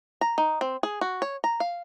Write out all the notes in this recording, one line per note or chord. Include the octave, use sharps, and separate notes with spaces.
A#5
D#4
C4
G#4
F#4
C#5
A#5
F5